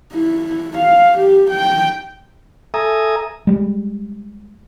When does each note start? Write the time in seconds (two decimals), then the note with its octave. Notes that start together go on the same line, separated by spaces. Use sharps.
0.14 E4
0.78 F5
1.17 G4
1.51 G5
2.74 A4 E5 G#5 A#5 D#6
3.47 G3 G#3